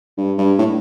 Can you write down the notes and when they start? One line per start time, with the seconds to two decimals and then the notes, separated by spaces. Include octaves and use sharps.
0.17 G2
0.38 G2
0.58 A2